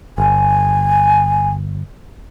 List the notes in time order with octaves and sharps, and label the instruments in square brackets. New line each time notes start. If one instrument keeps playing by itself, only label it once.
[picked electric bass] G1 [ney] G#5